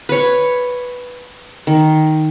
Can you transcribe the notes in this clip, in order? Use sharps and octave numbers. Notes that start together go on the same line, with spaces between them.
B4 C#5
D#3